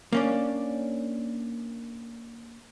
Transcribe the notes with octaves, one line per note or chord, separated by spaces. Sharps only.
A#3 C#4 D4